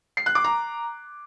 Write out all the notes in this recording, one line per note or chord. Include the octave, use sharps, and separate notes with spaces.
C7
F#6
D6
A#5